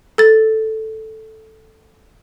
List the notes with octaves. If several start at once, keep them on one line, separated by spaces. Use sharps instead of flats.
A4 A6